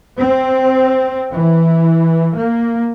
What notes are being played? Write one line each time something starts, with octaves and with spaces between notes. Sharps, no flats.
C4
E3
A#3